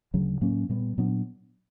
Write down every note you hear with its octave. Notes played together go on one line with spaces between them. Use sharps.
D2 C#3 F#3
A2 F#3 A#3 C#4
A#2 G3 B3
A#2 F#3 B3 D4